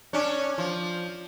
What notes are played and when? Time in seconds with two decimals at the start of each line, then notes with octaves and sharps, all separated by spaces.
0.13 C#4 D4
0.58 F3